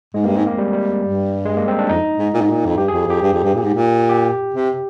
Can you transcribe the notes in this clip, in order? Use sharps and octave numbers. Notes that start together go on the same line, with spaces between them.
G#2 G#3
G2 A#3
G#2 C4
A#3
G3
G3
G2
G#3
A#3
C4
D4
F2 D#4
G#2
A#2
G#2
A#2
F2
G2 G4
F2 G#4
F2 G4
G2
F2
G2
A#2
G#2
A#2
G4
C3